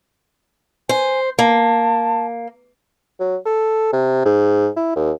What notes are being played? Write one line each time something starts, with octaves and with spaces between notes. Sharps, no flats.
C5 G#5
A#3 A5
F#3
A4
C3
G#2
E4
D#2